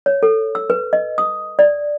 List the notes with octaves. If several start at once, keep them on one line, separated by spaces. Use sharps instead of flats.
C#5
A4
E6
B4
D#5
D#6
D5